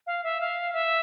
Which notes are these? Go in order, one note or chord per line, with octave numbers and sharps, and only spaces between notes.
F5
E5
F5
E5